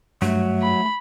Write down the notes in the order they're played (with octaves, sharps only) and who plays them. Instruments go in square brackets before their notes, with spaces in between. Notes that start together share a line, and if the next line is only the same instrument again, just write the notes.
[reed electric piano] G2 [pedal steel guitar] F#3 [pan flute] A3
[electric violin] B5